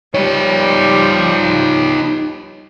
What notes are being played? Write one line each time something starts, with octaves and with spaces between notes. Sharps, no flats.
F3 G3 D#4 C#5